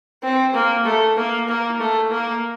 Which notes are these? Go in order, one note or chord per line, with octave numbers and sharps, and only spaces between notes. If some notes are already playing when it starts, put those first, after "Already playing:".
C4
A#3
A3
A#3
A#3
A3
A#3